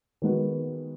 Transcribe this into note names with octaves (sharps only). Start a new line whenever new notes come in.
D#3 G#3 B3 F#4